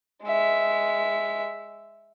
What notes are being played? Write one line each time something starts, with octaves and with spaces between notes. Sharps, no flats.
G#3 E5